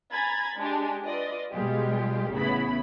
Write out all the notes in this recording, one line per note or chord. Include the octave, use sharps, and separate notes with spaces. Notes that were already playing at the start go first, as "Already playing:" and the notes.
G#5 A#5 B5 G#6 A6
G#3 D4 G4
F4 B4 D5 D#5
B2 G3 G#3 F4 G4
A1 C#3 B3 E4 B5